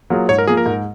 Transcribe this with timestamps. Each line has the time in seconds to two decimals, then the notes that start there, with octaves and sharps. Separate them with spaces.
0.10 F#3 A#3 F4 G#4
0.29 G#2 C#5
0.38 A#4
0.47 F3 A#3 G#4
0.57 A#4
0.66 G#2